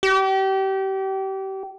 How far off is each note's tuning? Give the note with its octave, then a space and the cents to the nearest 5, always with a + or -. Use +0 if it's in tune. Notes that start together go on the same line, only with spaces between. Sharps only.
G4 -30